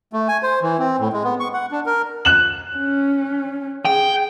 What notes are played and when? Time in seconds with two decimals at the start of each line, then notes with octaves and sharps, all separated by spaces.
0.13 A3
0.28 G#5
0.43 C5
0.62 E3
0.79 C4
0.99 A2
1.13 G#3
1.24 B3
1.40 C#6
1.54 F#5
1.71 D4
1.86 A#4
2.25 F#6 E7 F#7
2.77 C#4
3.85 G#4 G5